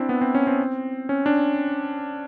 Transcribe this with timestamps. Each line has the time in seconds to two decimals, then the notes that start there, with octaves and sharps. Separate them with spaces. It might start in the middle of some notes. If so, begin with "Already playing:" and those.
Already playing: C4 D4 E4
0.09 B3
0.21 C4
0.35 C#4
0.47 C4
1.09 C#4
1.26 D4